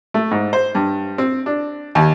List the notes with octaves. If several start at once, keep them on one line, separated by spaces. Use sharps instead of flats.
A3
G#2
C5
G2
C4
D4
D#2